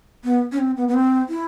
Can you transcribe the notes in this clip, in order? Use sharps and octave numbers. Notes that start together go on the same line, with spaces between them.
B3
C#4
C4
B3
B3
C4
E4